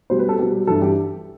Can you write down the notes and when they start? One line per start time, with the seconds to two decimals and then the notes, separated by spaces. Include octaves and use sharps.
0.10 B2 G3 C5
0.19 B4
0.29 A4
0.39 B2 G3 G4
0.67 G2 E3 G3 A4
0.82 G4